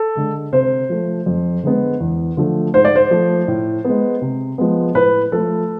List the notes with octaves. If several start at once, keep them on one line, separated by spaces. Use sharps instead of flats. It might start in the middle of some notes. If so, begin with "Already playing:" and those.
Already playing: A4
D3 G#3
C3 C5
F3 A3
F2
D3 G#3 B3
E2
D3 F3 A3
G#2 C5
D5
C5
F3 A3
A2
G#3 B3
C3
F3 G#3 B3
A2 B4
F3 A3 A4